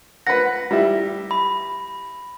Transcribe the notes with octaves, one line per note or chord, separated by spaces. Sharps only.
B4 F#5 A#6
G3 E4
B5